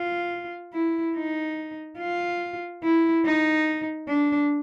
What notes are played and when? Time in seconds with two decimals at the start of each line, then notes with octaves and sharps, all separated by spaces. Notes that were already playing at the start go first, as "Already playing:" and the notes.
Already playing: F4
0.74 E4
1.16 D#4
1.99 F4
2.83 E4
3.25 D#4
4.08 D4